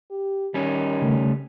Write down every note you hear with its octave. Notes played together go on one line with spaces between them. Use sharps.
G4
D#3 G3 C#4
C#3 A3